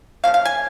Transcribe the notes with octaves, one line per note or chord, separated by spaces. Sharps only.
C#3 F3 A#3 F5
F5
G#5